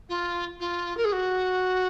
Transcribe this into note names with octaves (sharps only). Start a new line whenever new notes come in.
F4
F4
A#4
G#4
F#4